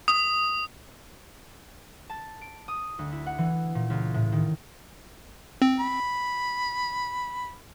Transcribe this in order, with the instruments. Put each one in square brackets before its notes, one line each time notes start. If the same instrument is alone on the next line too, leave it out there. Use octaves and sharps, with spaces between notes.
[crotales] D#6
[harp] A5
D7
D#6
D2
E4
F#5
E3
A#2
C#2
A2
D#3
[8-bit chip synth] C4
[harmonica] B5